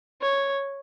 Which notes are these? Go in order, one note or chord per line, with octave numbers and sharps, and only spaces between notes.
C#5